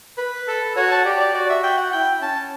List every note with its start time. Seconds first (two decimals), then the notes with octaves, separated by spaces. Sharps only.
0.18 B4
0.48 A4
0.76 F#4 C#5
0.91 A5
1.05 G4 D5
1.20 D5
1.34 F#4 D5
1.49 E5
1.63 G5
1.77 F#5
1.92 E4 G5
2.21 C#4 A5